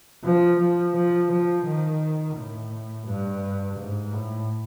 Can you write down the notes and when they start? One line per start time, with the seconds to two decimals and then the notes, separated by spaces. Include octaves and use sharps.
0.24 F3
0.59 F3
0.95 F3
1.30 F3
1.66 D#3
2.36 A2
3.07 G2
3.78 G#2
4.13 A2